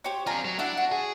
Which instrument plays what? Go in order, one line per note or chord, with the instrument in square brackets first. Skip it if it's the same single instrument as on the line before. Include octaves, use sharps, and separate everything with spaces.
[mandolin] G4 C5 C#5
[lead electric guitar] C4 F4 [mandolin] D4 G#5 A#5
[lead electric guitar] F#3
[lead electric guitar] D4 [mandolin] E4 A4 F#5
[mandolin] F#4
[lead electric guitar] G#4